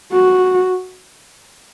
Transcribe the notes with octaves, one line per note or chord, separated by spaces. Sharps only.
F#4